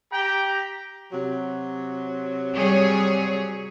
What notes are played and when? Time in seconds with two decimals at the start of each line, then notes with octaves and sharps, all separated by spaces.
0.12 G4 G5 A#5
1.11 C3 F#3
2.56 G3 G#4 C#5